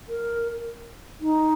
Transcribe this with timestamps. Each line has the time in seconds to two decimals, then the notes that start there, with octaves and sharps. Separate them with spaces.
0.08 A#4
1.21 D#4